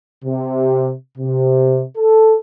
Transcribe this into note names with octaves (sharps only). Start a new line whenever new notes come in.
C3
C3
A4